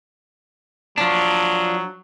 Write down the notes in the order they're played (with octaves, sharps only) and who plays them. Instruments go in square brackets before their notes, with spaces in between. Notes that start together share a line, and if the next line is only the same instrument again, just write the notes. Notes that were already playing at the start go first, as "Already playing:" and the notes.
[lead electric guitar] F3 D4 [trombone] F#3